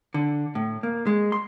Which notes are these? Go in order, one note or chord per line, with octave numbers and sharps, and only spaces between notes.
D3
A2
A#3
G#3
C6